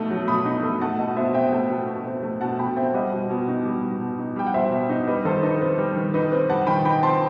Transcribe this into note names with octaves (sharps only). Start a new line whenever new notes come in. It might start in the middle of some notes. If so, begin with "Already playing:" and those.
Already playing: B2 A3 D#4
F#3
B2 B5 D#6
D#4
A3
A3 F#5 A5
B2 D#5 F#5
B2 C5 E5
C4 E5 G5
A3
B2
B2
C4
A3
B2 F#5 A5
B2 G5 B5
C4 E5 G5
G3 D#5 F#5
B2
B2
D#4
G3
B2
B2
D#4
G3 G5
F#5
B2 C5 E5
B2
D#4
G3 B4 D#5
D#3 A4 C5
D#4 B4
C4 B4
G3
D#3
D#4 B4
C4 B4
G3 F#5 A5
D#3 G5 B5
D#4 G5 B5
C4 A5 C6